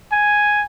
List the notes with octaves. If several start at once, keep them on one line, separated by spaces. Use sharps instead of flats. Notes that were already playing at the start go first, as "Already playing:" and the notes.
G#5